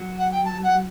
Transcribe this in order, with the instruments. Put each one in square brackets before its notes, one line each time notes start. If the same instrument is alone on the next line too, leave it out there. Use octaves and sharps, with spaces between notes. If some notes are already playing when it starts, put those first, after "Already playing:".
Already playing: [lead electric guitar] F#3
[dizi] F#5
G5
A5
F#5